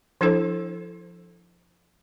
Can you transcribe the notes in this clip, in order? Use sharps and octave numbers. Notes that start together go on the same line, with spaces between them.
F3 D4 E4 A4 C5